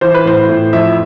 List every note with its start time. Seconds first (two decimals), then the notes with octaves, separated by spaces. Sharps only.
0.01 E3 C5
0.14 B4
0.25 A2 C5
0.49 A2
0.73 F2 E5